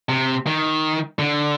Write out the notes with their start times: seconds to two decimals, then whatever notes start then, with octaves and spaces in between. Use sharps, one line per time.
0.09 C3
0.47 D#3
1.19 D3